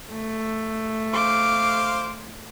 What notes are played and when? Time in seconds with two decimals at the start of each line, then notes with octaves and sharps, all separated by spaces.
0.12 A3
1.13 C5 F5 D6